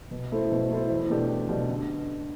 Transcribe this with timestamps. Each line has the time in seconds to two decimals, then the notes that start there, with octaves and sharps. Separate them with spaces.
0.11 B2
0.32 A3 E4 A4 C5
0.51 B2
0.71 A3 E4 A4 C5
0.90 E2
1.10 B2 A3 D4 G4
1.29 E2
1.49 B2 A3 D4 G4
1.68 D3